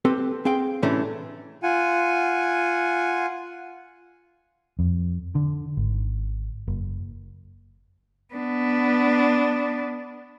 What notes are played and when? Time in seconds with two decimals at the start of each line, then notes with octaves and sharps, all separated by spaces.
0.05 C4 G4 A4 B4
0.45 C4 G#4 F5 G5
0.82 A2 C3 E3 A3 C#4 D4
1.63 F4 F#5 G#5
4.79 F2
5.35 D3
5.77 G#1
6.67 F#1
8.34 B3 D4